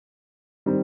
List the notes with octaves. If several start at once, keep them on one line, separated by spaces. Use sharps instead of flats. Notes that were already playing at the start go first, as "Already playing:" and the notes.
D#3 G3 C4